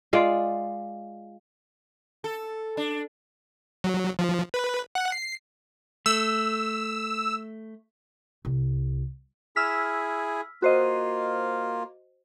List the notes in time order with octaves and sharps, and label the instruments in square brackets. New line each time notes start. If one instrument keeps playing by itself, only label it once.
[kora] G#3 F4 D5
[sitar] A4
D4
[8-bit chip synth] F#3
F3
B4
F#5
C7
[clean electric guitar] A3 [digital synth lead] E6
[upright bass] C2
[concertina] E4 G#4 [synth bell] E6 F6 B6
[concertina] A#3 F4 [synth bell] F#4 C5 D#5